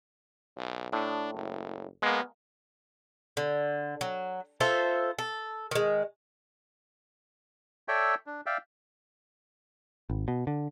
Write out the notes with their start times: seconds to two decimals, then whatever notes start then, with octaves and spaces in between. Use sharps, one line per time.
0.56 B1
0.92 A2 D4
1.34 F#1
2.02 G#3 A#3 B3
3.37 D3
4.01 F#3
4.60 F4 A4 C5 E5
5.18 A4
5.71 D#3 G#3
7.88 A4 C#5 D5 E5 G5
8.26 D4
8.46 D5 E5 F5 G5
10.10 G#1
10.28 B2
10.47 D3